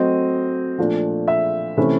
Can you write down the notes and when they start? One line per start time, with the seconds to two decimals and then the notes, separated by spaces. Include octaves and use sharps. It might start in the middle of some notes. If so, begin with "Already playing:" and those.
Already playing: F#3 A3 C4 D#5
0.78 A#2 F3 A3 D4
1.28 E5
1.77 C3 E3 A3 C#4 E4